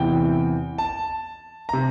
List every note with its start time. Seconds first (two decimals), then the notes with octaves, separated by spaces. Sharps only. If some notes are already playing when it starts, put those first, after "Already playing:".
Already playing: E2 C3 E3 G5
0.78 A5
1.69 C3 A#5